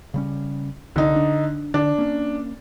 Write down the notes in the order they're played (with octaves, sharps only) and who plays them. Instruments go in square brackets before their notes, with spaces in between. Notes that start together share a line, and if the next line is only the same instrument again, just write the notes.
[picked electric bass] C#3 G3 C#4
[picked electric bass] C2 [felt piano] D3 D#4
[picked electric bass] D4
[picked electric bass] D3 [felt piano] D4
[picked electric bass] A#3 C#4